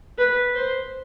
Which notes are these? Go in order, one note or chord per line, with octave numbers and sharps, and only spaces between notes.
B4
C5